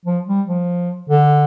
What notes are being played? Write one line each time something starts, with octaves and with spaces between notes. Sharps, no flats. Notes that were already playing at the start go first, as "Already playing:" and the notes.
F3
G3
F3
D3